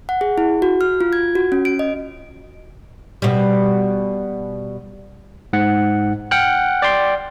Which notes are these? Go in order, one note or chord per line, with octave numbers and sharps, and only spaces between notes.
F#5
G#4
E4
F#4
F6
F4
G#6
F#4
C#4
D7
D#5
B2 G3
G#2 F#5
F#5 G5 F6 F#6
D5 G5 C6